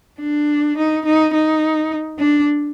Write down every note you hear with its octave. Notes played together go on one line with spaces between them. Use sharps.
D4
D#4
D#4
D#4
D4